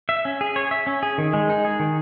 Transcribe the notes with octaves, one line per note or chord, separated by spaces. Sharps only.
E5
C#4
G#4
C#5
E5
C#4
G#4
D#3
G#3
D#4
G#4
D#3